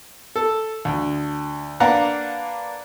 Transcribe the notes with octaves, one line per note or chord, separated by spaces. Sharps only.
A4
D2
A#3 D4 B4 F5 F#5 A#5